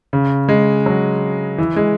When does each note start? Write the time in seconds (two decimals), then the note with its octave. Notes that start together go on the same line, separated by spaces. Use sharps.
0.13 C#3
0.49 G#3
0.86 F#3
1.58 E3
1.76 G#3